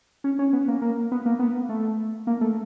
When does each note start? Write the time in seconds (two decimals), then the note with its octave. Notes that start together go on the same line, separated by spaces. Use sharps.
0.24 C#4
0.39 C#4
0.53 B3
0.68 A#3
0.82 A#3
1.12 B3
1.26 A#3
1.39 B3
1.69 A3
2.27 A#3
2.41 A3